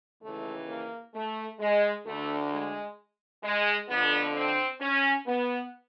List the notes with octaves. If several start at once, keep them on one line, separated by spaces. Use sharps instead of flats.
D#2 C#3 E3 A3
A#3
A3
G#3
D2 D3 A3
G#3
G#3
F2 D3 B3
C4
C#4
B3